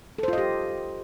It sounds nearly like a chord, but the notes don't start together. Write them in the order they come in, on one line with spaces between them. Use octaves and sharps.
A4 C5 F4 D#5 G4